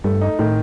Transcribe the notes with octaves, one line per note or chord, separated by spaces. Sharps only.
G2 A3
D#4
A2 D#3